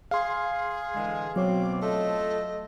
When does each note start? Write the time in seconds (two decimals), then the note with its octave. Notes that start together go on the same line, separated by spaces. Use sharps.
0.11 G#4 F5 C6
0.94 D3 E3 G#3
1.36 B2 F#3 C4 C#5 D6
1.81 A3 F4 A4 D#5